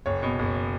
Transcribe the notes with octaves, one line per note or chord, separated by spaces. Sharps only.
F#1 C#5
B2
F#1